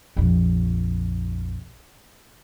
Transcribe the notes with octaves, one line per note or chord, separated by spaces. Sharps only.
A#1 F2